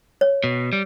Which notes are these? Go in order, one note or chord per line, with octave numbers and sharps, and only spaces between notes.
C#5
B2
G3